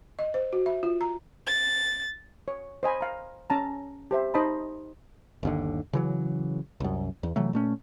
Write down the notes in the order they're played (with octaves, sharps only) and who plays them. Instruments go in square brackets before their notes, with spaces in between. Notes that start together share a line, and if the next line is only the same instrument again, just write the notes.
[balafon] D#5
C5
F#4
E5
F4
A#5
[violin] A6
[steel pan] C#5
C5 D#5 G#5 B5
F5 A#5
C#4 A5 A#5
G4 C5 E5
D#4 C5 D#5 A5 B5
[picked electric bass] G1 D#2 D3
C#3 E3 F#3
C2 F#2
E2
C3 E3 F#3 A3
A#2 A3 C#4